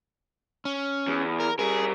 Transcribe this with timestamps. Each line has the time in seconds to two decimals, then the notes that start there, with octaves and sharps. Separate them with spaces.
0.65 C#4
1.07 E2
1.40 A#4
1.59 G3 G#4 A#4